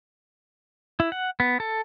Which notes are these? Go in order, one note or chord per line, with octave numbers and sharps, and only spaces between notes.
E4
F#5
B3
A4